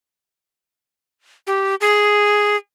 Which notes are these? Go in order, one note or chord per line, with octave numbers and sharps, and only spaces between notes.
G4
G#4